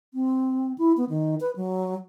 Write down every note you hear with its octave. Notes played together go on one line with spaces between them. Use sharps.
C4
E4
B3
D#3
B4
F#3